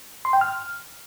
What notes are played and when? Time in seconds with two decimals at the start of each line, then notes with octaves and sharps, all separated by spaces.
0.25 C6
0.33 G5
0.41 F6